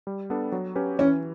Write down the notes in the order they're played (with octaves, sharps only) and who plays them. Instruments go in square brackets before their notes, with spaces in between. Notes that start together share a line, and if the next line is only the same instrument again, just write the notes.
[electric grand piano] G3
B3 D4 A4
F#3
C#4 G4 B4
[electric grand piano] E3 [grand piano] C#4